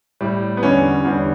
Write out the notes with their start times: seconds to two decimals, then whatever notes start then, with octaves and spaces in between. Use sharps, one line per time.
0.21 A2 G3
0.57 B3
0.63 E2 D3 G3 C#4
1.05 E2 D3 G3